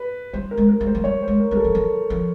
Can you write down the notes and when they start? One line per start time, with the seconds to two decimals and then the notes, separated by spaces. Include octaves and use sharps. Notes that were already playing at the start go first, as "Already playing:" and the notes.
Already playing: B4
0.33 G3 C5
0.51 A#4
0.57 G#3
0.69 A#4
0.81 G#3
0.87 C5
0.95 F#3
1.04 G3 C#5
1.22 C5
1.28 G#3
1.40 A#4
1.51 G3 A#4
1.57 A4
1.64 F3
1.75 F#3
2.10 F3